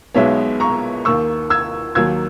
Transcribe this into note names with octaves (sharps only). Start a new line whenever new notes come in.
B1 B2 G#3 B3 C#5 E5
A#5 C#6
D#2 D#3 A#3 C#6 E6
E6 G#6
D#2 D#3 F#3 A#3 E6 G#6